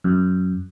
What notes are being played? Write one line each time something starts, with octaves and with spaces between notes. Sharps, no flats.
F#2